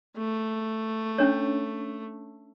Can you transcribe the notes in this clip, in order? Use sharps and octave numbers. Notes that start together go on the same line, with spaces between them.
A3
C#4 D4 C#5